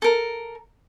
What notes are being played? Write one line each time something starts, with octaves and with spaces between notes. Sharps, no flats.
A4 A#4